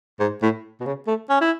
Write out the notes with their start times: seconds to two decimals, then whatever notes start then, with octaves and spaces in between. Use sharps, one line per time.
0.20 G#2
0.42 A2
0.81 B2
0.86 C#3
1.07 A3
1.30 C#4
1.41 E4